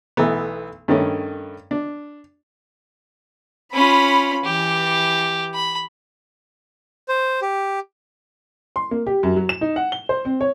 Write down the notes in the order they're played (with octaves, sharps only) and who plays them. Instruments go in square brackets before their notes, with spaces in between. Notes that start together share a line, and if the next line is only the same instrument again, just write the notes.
[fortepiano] B1 E3 A3 B3
G2 D#3 A3 C#4
D4
[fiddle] C#4 F4 [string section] B5
[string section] E3 [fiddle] G4
[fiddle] B5
[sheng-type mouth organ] C5
G4
[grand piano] C6
A#3
G4
F#2
F#3
E7
D#4
F#5
G7
C5
C4
C#5